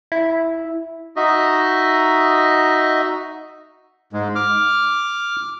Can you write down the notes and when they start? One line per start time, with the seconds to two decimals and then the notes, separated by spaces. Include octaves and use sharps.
0.12 E4
1.16 D#4 F#4 D#5 E5
4.13 G#2 G#3
4.35 D6 F6